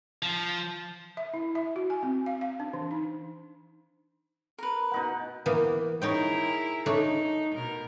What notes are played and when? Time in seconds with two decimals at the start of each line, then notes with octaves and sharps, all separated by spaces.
0.22 F3
1.17 E5
1.34 E4
1.55 E5
1.76 F#4
1.90 G#5
2.03 C4
2.26 F5
2.41 F5
2.60 D4
2.73 E3
2.91 D#4
4.58 A#4 B4
4.91 B2 D#4 F#5
5.46 E3 A#3 B3
6.02 D#4 E4 G#4 A#4 C#5 G5
6.86 A3 D4 D#4 C#5
7.54 B2 A#4